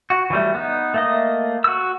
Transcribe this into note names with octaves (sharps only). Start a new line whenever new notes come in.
F#4
E3 F#3 G3 A3
B3 D#4
A3 A#3 D#5
F#4 E6